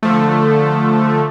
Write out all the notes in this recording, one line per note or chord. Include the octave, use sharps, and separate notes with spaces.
D3 F3 A3